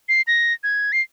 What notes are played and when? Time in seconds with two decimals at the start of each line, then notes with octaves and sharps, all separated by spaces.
0.09 C7
0.27 A#6
0.63 G#6
0.92 C7